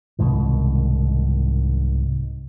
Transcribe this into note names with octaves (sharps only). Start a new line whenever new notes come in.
C2 G#2 B2 D#3